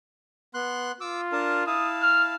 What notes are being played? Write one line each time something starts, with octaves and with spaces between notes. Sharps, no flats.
B3 C6 F#6
F4 D6 E6
D4 A#4 A5
E4 F5 A5 D#6
F6